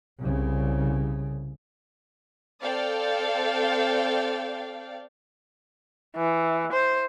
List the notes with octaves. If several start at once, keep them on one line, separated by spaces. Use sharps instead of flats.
C2 C#3
C4 A4 D5 F5 G5
E3
C5